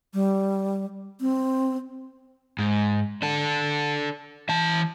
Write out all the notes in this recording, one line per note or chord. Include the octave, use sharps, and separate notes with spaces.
G3
C4
G#2
D4 A4
E3 A5